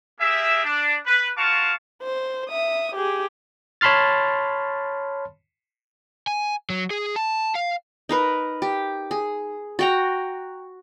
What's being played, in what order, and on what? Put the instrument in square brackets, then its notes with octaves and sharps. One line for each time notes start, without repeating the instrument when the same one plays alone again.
[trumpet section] A#3 G4 G#4 E5
D4
B4
A#3 F4 F#4 F5 A5 C#6
[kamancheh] C5
E5 D#6
G4 G#4
[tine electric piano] C#5 A5 B5 C6 F6 A6
[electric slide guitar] G#5
F#3
G#4
A5
F5
[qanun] D#4 A#4 B4
G4
G#4
F#4 G5 A#5